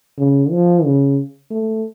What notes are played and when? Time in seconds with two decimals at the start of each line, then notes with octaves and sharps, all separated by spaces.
0.18 C#3
0.51 F3
0.85 C#3
1.50 A3